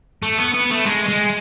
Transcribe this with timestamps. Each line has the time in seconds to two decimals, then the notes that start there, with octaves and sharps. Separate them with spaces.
0.22 A3
0.38 B3
0.54 B3
0.71 A3
0.86 G#3
1.09 G#3